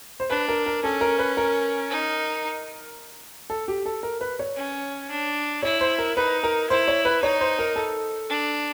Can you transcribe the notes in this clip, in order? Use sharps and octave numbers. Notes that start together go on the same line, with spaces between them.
C5
D4 B4
A#4
A#4
C#4 A4
A#4
B4
A#4
D#4
A4
G4
A4
A#4
B4
C#5
C#4
D4
E4 C#5
C5
A#4
D#4 B4
A#4
E4 C5
C#5
B4
D#4 C#5
C5
A#4
A4
D4